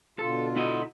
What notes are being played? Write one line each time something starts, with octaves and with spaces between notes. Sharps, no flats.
B2 D3 F4 A4
E4 F#4 D#5